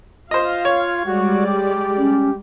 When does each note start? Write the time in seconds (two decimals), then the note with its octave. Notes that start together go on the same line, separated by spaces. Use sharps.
0.31 F4 C5 D#5 F5
0.65 C#5
1.06 G3 G#3 F#4 D5
1.46 G4
1.98 C#4